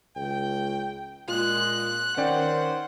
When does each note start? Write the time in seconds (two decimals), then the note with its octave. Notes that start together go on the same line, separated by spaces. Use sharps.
0.16 C#2 G5
1.28 A#2 G#3 F4 F#6
2.17 D#3 C#4 C5 D5 F#5 G5